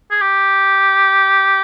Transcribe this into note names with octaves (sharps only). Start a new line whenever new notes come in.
G#4
G4